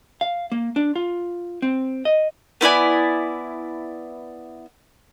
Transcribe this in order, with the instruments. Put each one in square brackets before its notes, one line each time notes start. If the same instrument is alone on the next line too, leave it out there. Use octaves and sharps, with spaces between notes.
[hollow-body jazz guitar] F5
A#3
D4
F4
C4
D#5
[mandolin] B3 E4 D5 G#5